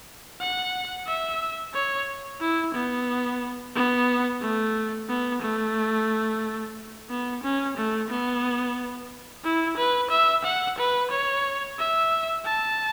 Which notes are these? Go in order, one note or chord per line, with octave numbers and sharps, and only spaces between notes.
F#5
E5
C#5
E4
B3
B3
A3
B3
A3
B3
C#4
A3
B3
E4
B4
E5
F#5
B4
C#5
E5
A5